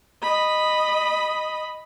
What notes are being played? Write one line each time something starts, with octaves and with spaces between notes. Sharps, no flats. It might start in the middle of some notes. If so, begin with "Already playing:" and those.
D#5 B5